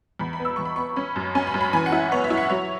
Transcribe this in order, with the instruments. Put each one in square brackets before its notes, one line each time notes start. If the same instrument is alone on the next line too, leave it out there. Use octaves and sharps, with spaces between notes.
[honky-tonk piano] E2 B5
B5
B3
E6
E2 C#6
B5
B3 C#6
C#4 B5
F#2
C#4 G#5
B5
F#2
B5
E3 G#5
F#5
E4
B3 C#5
E5
E4
F#5
F#3 C#5